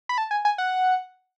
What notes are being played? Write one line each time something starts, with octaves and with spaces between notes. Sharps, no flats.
B5
A5
G#5
G#5
F#5